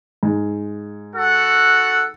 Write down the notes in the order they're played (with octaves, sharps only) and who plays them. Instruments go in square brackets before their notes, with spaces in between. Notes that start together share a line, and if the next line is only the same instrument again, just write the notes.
[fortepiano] G#2
[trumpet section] F#4 A4 F#5